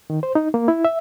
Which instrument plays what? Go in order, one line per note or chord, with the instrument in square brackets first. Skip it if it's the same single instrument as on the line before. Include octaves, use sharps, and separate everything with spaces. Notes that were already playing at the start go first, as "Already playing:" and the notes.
[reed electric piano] D#3
C5
D#4
A#3
E4
E5